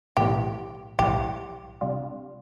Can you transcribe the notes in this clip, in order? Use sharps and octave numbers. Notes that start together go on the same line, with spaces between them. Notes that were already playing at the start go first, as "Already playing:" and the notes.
B1 A2 E3 G3 G4
B1 A2 E3 G3 G4
C3 G3 D4 F4